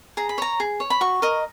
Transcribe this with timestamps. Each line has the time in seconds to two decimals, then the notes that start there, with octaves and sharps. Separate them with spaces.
0.17 G#4 A#5
0.29 B5
0.38 C#5 A#5
0.60 G#4
0.80 C#5
0.90 B5
1.01 F#4 C#6
1.22 A#4 D#5